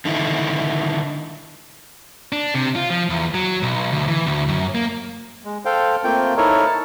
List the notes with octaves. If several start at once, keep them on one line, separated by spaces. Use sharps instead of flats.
D3 D#3 E4
D4
C3
F4
F3
E2
F#3
B1
D2
E3
D2
F#2
A#3
G#3
A4 C5 F5 G5
A3 A#3 C4 F4 G5
D#4 E4 A4 A#4 C#5
A5